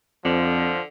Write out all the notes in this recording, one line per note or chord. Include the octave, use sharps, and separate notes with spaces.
F2 D3 F3